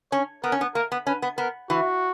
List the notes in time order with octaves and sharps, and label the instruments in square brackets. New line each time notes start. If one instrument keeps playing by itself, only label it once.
[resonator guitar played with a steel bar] C#4 [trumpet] C#5
[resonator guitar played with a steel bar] B3 [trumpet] A#4
[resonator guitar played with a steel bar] C#4
B3
[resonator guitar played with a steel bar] A#3 [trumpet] A#4
[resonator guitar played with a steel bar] B3
[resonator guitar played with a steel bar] C#4 [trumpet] B4
[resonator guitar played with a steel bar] B3
[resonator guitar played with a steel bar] B3 [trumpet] A#4
[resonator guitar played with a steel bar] E3 [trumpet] F#4